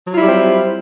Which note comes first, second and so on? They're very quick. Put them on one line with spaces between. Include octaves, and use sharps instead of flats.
F#3 F4 E4 G3 C4